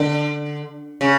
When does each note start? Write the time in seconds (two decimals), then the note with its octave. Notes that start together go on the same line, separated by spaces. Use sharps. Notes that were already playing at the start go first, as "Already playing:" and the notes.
Already playing: D3
1.01 C#3